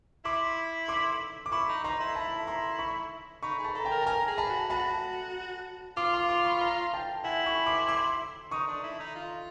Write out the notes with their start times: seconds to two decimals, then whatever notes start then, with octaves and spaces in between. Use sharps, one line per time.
0.25 E4 C6 D6
0.88 C6 D6
1.46 D6
1.52 E4 B5 C#6
1.68 D#4
1.84 D#4 A#5 C6
2.00 E4
2.15 E4 A5 B5
2.47 A#5 C6
2.79 B5 C#6
3.43 D#4 B5 C#6
3.59 G#4
3.64 A5 B5
3.75 A4 A#5
3.85 G5 A5
3.91 A#4
4.02 A5
4.06 A#4 G#5 A#5
4.28 G#4
4.38 A5 B5
4.49 F#4
4.70 F#4 A5 B5
5.97 F4 C6 D6
6.14 C6 D6
6.29 C6 D6
6.45 B5 C#6
6.61 A#5 C6
6.94 G5 A5
7.24 E4 F#5 G#5
7.46 B5 C#6
7.67 C6 D6
7.88 C6 D6
8.51 D#4 C#6 D#6
8.68 D4
8.84 E4
9.00 D#4
9.15 F4